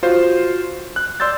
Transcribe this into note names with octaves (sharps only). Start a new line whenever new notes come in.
F4 F#4 C5
F#6
D5 C6 E6 G6 A6